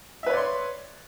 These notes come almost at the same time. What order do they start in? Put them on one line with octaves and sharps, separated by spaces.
E5 B4 C#5 D5 C6